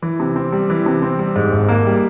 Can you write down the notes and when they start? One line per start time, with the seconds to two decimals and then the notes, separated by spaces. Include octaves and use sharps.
0.02 E3
0.20 C3
0.36 C4
0.52 G3
0.70 E3
0.86 C3
1.02 C4
1.19 G3
1.36 G#2
1.52 G#1
1.69 A#3
1.86 G3